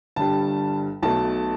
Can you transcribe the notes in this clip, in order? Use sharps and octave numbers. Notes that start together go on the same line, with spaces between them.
G1 G2 G3 A5
B1 B2 A3 A5